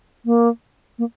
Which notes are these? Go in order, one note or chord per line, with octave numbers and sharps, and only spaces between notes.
A#3
A#3